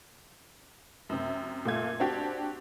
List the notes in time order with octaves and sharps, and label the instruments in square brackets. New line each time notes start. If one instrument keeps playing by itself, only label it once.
[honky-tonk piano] F#2 C3
A#2 A3 F4 G#6
C4 D4 F#4 G4